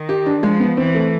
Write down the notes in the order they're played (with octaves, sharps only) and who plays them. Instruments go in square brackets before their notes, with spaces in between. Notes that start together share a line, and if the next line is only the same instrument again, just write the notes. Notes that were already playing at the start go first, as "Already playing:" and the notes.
Already playing: [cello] D#3
[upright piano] G4
D4
[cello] F3 [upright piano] G#3
[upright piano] B3
[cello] E3 [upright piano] C4
[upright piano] A3